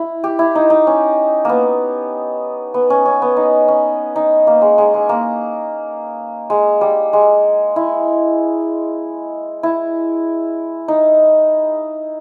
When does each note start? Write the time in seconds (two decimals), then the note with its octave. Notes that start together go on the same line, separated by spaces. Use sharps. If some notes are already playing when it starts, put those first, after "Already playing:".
Already playing: E4
0.24 G4
0.39 E4
0.55 D#4
0.70 D#4
0.87 C#4
1.45 A#3 B3
2.74 B3
2.90 C#4
3.05 C#4
3.22 B3
3.37 D#4
3.68 C#4
4.16 D#4
4.47 A#3
4.62 G#3
4.78 G#3
4.94 G#3
5.09 A#3
6.50 G#3
6.81 G3
7.13 G#3
7.76 E4
9.63 E4
10.88 D#4